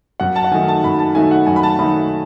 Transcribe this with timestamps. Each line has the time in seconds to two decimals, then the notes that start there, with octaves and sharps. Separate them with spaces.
0.20 F#2 F#5
0.36 A5
0.44 F#5
0.51 D#3 F#3 A3 D#4 G#5
0.68 A5
0.84 F#2 B5
0.99 A5
1.15 D#3 F#3 A3 D#4 G#5
1.31 F#5
1.46 F#2 G#5
1.56 B5
1.63 A5
1.79 D#3 F#3 A3 D#4 B5